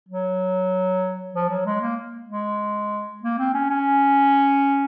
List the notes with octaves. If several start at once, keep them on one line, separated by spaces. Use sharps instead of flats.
F#3
F3
F#3
G#3
A#3
G#3
A#3
C4
C#4
C#4